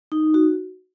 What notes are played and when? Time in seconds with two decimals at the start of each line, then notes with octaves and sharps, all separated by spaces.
0.12 D#4
0.34 F#4